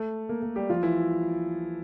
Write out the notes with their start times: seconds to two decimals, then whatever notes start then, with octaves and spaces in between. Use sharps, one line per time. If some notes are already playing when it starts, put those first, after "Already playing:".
Already playing: A3
0.29 A#3
0.42 A#3
0.56 G3 G4
0.70 F3 F4
0.83 E3 E4